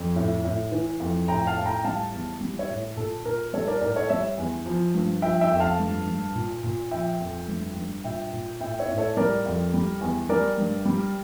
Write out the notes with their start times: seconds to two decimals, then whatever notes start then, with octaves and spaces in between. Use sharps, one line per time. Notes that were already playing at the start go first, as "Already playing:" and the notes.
Already playing: F2
0.16 A2
0.44 A2
0.72 E3
1.00 F2
1.28 A2 G5 A#5
1.47 F5 A5
1.57 A2
1.65 G5 A#5
1.84 G3 F5 A5
2.13 E2
2.41 G3
2.59 C#5 E5
2.69 A2
2.97 A#2 A4
3.25 A#2 A#4
3.53 G3 A4 C#5
3.67 A#4 D5
3.81 A2 A#4 D5
3.96 A4 C#5
4.09 G3 C#5 E5
4.38 E2
4.66 F3
4.94 G2
5.22 F3 E5 G5
5.41 E5 G5
5.51 F2
5.60 F5 A5
5.79 G2
6.06 G2
6.35 A#2
6.63 A#2
6.91 F3 E5 G5
7.20 F2
7.48 G2
7.76 G2
8.04 A#2 E5 G5
8.33 A#2
8.60 A2 E5 G5
8.79 C#5 E5
8.88 A2
8.98 A4 C#5
9.17 G3 A#4 D5
9.46 F2
9.74 G3
10.01 E2
10.29 G3 A#4 D5
10.58 G2
10.85 G3